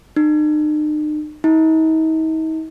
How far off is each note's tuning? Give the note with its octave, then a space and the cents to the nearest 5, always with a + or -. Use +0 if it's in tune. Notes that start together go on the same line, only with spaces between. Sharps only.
D#4 -45
D#4 +40